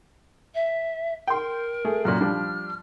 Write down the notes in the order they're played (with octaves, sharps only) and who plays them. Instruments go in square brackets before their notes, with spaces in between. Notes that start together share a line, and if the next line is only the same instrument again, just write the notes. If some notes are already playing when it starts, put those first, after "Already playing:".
[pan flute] E5
[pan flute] A#4 [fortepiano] G5 C6
[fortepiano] A3 G#4
[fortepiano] F#2 A#2 [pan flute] F6
[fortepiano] F3 G3 D4